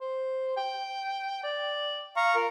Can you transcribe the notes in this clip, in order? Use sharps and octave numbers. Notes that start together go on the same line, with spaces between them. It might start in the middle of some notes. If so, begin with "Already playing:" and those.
C5
G5
D5
F5 A#5 C#6
F4 A#4